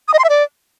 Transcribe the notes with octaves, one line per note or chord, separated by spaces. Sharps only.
D#6
D#5
C6
E5
D5